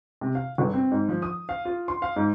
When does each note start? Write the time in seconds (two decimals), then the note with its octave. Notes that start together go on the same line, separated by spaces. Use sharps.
0.21 C3
0.35 F5
0.58 G1
0.74 C4
0.91 G#2
1.09 F3
1.22 D#6
1.49 F5
1.65 F4
1.88 C6
2.02 F5
2.16 G#2